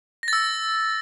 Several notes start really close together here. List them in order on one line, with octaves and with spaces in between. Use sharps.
A#6 A6 E6